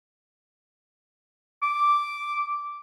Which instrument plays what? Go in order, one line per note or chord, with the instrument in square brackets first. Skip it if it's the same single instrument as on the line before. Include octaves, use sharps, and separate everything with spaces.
[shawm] D6